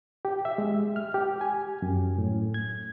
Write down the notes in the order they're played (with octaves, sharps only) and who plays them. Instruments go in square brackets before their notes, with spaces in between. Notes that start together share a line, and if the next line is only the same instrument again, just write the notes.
[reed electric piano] G4
E5
G#3
F6
G4
G#5
F#2
A2
G#6